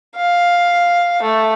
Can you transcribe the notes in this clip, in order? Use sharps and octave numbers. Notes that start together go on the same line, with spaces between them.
F5
A3